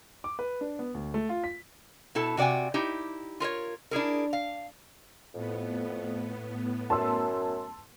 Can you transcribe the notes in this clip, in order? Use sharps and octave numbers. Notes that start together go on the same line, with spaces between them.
D6
B4
D4
B3
D2
A3
F4
B6
B2 E4 A4 A5
C3 F#4 D5 G5 G#5
D#4 E4 G4
F4 A#4 C5 C#5
D4 E4 G#4 A#4
F5
F2 A2 B3
F#2 A5 C6 E6